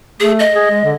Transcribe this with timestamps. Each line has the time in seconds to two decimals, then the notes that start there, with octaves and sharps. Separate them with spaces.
0.20 A3 G#4
0.39 D#5
0.55 G#4
0.70 G#3
0.84 D3